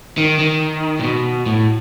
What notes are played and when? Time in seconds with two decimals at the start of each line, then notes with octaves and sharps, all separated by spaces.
0.17 D#3
0.39 D#3
0.99 A#2
1.03 B2
1.46 A2